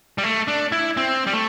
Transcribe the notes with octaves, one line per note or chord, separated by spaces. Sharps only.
G3
A3
D4
E4
C4
G3
A3